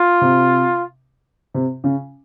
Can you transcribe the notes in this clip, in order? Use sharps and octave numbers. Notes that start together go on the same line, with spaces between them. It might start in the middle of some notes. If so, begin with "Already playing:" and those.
Already playing: F4
C3
C3
C#3